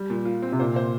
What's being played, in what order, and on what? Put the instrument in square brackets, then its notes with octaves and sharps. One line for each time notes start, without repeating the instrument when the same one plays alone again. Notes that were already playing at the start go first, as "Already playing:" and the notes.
Already playing: [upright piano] G3
A#2
F4
C4
[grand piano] C3
[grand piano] A#2 [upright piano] C5
[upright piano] C5